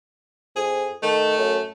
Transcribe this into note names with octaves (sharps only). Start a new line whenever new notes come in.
F2 G#4
D#3 A3
F#2